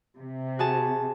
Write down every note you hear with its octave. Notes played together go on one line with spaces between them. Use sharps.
C3
F#4 G#4 A5